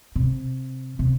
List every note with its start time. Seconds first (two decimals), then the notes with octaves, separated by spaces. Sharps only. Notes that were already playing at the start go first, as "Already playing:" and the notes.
0.16 C3
0.99 C3